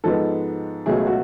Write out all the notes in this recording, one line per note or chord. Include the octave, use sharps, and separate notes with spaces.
G#2 F3 G#3 B3 A4
C#2 B2 F#3 A3 G#4
F#4